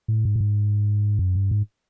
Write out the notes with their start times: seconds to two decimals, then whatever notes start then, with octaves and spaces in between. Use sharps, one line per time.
0.08 A2
0.25 G#2
0.36 A2
0.40 G#2
1.19 F#2
1.35 G2
1.51 G#2